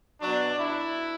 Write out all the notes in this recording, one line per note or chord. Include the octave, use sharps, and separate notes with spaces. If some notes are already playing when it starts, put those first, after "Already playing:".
B2 F#3 D4
E4